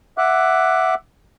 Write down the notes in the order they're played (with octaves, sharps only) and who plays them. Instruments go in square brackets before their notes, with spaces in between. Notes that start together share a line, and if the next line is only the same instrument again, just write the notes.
[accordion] E5 F#5 D6 F#6